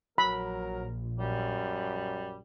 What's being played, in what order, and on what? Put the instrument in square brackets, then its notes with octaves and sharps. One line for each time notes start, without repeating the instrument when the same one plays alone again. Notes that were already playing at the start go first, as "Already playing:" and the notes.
[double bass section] A#1 [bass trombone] F#3 [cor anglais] A#4 [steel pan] B5
[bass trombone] F#2 [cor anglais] G3